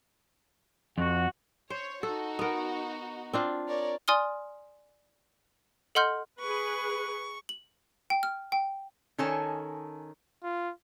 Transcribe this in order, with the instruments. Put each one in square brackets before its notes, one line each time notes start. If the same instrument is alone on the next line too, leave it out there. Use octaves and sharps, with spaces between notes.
[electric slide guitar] F2 [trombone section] F#4
[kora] C5 [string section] C#5
[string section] D#4 F#4 [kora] A4
[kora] B3 A#4
C4 D4 F4
[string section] A#4 C#5 D5
[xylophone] D5 G#5 C6 D#6 F6 G7
A4 D#5 F#5 C6 F6 G6
[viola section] G#4 B4 [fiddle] C#6
[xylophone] F#7
G5
F6
G5
[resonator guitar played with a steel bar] D#3 C#4 A4 C#5 G#5 A5
[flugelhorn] F4